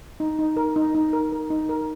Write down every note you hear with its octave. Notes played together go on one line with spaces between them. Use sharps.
D#4
D#4
A#4
D#4
D#4
A#4
A#4
D#4
A#4